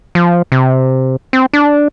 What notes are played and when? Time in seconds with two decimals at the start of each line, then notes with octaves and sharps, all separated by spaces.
0.15 F3
0.52 C3
1.33 C4
1.53 D4